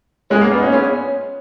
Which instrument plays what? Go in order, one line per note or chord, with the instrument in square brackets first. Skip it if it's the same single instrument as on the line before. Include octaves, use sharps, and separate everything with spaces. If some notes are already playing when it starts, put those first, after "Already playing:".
[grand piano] G#3 [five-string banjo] B3 F4 G#4 C#5
[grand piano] A#3
B3
D#4
C#4
[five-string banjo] B3 F4 G#4 C#5